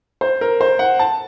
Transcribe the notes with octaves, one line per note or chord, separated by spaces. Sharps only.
C5
A#4
C5
F#5
A5